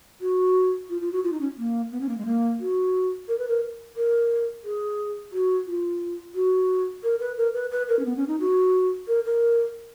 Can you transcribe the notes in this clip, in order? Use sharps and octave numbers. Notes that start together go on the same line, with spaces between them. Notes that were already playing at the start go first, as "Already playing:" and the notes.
F#4
F4
F4
F#4
F4
D#4
C#4
A#3
B3
C#4
A#3
G#3
A#3
F#4
A#4
B4
A#4
A#4
G#4
F#4
F4
F#4
A#4
B4
A#4
B4
B4
A#4
C#4
B3
C#4
D#4
F#4
A#4
A#4